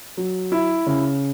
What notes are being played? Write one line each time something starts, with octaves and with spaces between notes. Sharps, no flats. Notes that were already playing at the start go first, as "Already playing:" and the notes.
F#3
E4
C#3